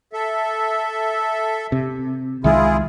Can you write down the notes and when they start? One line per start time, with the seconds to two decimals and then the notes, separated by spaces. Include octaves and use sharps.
0.13 A4 E5
1.72 C3
2.44 C2 D#3 G#3 E4 F4 G#4 E5